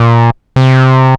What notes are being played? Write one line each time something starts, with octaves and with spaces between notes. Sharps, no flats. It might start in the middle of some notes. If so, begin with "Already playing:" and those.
Already playing: A#2
C3